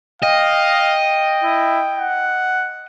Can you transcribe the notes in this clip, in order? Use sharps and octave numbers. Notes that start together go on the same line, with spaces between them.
D#5 F5 G5
E4
F#5